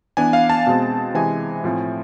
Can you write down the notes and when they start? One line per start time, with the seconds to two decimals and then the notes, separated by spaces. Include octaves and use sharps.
0.17 E3 B3 D4 G#5
0.33 F5
0.50 A5
0.67 B2 G#3 C4
1.15 C3 E3 G#3 G#5
1.64 A2 F3 A3 C4